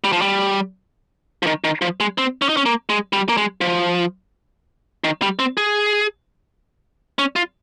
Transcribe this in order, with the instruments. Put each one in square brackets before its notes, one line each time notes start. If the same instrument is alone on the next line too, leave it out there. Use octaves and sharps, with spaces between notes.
[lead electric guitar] G3
F3
G3
F3
D#3
D#3
F3
G#3
C4
C#4
D#4
C#4
A#3
G#3
G3
A#3
G#3
F3
D#3
G3
C4
G#4
C#4
F4